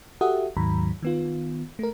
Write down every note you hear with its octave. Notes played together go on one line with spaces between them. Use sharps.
F#4 G4 A4 E5 F#5 D#6
D#2 G#2 D#3 F#3 A#5 B5
D#3 B3 F4
A3 A#4